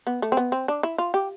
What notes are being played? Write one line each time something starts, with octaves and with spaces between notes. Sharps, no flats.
B3
A3
C4
B3
C4
D4
E4
F4
G4